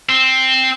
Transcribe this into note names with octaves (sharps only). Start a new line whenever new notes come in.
C4